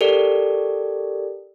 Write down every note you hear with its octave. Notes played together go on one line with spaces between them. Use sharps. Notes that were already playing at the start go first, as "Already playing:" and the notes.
G4 A4 A#4 D5